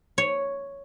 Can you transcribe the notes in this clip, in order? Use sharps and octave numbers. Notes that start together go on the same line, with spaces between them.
C#5